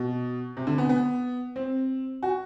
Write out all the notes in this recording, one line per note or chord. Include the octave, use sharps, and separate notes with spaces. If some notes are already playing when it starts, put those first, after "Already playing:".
Already playing: B2
C3
D3
B3
B3
C4
F#4